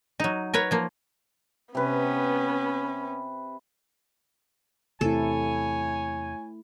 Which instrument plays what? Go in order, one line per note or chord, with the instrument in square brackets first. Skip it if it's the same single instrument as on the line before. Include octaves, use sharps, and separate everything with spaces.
[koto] F#3 D#4
A#4 B4 C#5
F3 A#3
[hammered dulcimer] C3 B4 [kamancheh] B3 C#4
[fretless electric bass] E2 C3 [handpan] A3 E4 [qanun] A4 [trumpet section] C#5 G#5